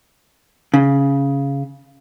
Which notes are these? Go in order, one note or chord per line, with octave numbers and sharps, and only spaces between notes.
C#3